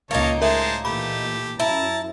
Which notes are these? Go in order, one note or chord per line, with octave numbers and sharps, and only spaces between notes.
C#2 A#2 A#3 D#4 A#4 C#5 A5
A2 G#3 A#4 C5 E5 A5
A#2 E3 A3 G4 B5
F#2 E4 A5 A#5